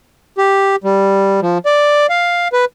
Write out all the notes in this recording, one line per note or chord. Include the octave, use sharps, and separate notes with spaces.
G4
G3
F3
D5
F5
B4